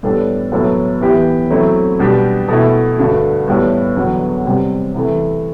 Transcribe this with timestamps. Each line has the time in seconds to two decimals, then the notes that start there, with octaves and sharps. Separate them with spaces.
0.03 A2 G3 B3 D4 A4
0.52 A2 F#3 B3 E4 A4
1.01 E3 B3 E4 G4
1.51 F#3 A3 C4 E4
1.99 B2 G3 B3 D4 G4
2.48 B2 A3 E4
2.97 G2 D3 A3 D4 F#4
3.47 A2 G3 B3
3.96 E2 D3 F#3 B3 F#4
4.44 C3 G3 C4
4.94 C3 E3 A3